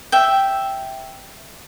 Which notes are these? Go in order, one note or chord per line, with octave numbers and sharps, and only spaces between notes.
E5 G5